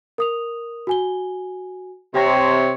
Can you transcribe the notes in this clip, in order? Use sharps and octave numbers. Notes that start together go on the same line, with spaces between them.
A#4 D#6 F7
F#4 G#5 G7
C3 G4 C#5 G5 A#6